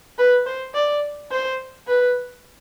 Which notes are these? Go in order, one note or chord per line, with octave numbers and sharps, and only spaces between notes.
B4
C5
D5
C5
B4